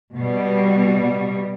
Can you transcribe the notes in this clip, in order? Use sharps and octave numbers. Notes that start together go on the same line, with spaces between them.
B2 G3